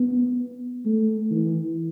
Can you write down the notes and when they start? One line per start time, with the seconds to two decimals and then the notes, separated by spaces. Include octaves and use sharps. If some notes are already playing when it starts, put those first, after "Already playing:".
Already playing: B3
0.86 A3
1.31 E3